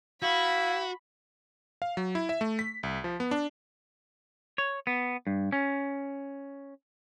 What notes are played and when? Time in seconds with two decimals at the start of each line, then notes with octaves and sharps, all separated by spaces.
0.22 E4 F#4 F5 B5
1.82 F5
1.97 F#3
2.15 E4
2.29 E5
2.41 A3
2.59 B6
2.83 C2
3.04 F3
3.20 B3
3.31 D4
4.58 C#5
4.87 B3
5.27 G2
5.52 C#4